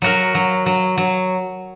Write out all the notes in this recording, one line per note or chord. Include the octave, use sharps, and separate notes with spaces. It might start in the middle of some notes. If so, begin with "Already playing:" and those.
F#3 F#4 A#4
F#3
F#3
F#3